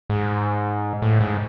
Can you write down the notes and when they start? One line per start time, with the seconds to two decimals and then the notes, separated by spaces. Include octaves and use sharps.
0.10 G#2
1.02 A2
1.20 G#2